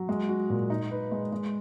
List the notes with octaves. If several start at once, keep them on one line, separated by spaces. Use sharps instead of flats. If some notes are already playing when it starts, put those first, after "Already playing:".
Already playing: F#3
G#3
F#4
A#2
D#4
B4
G#3
G#3